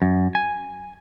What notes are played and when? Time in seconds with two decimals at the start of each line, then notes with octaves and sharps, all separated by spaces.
0.02 F#2
0.35 G#5